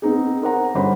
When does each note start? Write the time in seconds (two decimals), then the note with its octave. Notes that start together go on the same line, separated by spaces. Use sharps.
0.02 B3 C4 D#4 G#4
0.42 A#4 C5 F#5 A#5
0.75 G1 G3 C#4 C5 F#5 B5